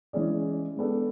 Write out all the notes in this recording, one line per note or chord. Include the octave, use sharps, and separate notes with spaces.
E3 G#3 C#4 G#4 D5
G#3 B3 D4 A4